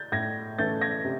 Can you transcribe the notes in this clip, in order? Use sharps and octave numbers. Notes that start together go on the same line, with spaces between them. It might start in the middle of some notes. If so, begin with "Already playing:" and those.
Already playing: G6 A6
A2 G#6 A#6
E3 A3 C#4 G6 A6
G#6 A#6
C3